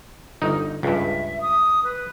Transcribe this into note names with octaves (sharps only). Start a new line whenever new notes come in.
G1 D#4
C#2 G2 E5
D#6
B4